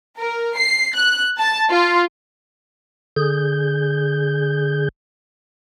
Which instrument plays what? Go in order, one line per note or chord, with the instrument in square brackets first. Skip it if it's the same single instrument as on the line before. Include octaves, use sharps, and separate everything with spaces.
[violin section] A#4
C7
F#6
A5
F4
[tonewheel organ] D3 G#4 G6